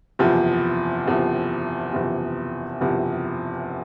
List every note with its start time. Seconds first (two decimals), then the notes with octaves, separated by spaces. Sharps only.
0.19 F#1 E2 C3 F3
1.07 F#1 E2 C3 F3
1.93 F#1 E2 C3 F3
2.81 F#1 E2 C3 F3